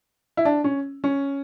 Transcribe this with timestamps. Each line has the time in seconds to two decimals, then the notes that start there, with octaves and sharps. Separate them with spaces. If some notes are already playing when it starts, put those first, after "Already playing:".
0.37 E4
0.45 D4
0.64 C#4
1.04 C#4